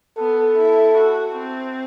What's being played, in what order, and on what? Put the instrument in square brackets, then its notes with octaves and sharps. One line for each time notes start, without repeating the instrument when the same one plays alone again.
[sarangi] B3 [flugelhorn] A4
[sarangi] E4
F#4
C4